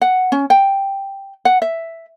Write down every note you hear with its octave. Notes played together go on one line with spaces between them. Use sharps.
F#5
C#4
G5
F#5
E5